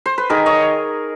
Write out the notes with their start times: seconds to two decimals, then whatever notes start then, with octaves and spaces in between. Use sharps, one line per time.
0.06 C5
0.18 B4
0.30 D#3 G#4 A#4
0.46 C#5 D#5